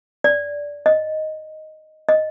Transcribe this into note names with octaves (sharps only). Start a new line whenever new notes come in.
D5
D#5
D#5